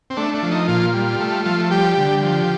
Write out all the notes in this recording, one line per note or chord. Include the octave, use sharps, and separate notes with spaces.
C4
A3 D4
D4
F3
D#4
A#2 F4
G3
A3
F3
G3 G4
D3
F3